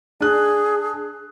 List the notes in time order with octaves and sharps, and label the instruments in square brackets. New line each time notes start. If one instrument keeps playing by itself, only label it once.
[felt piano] D4 F#6 [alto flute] G#4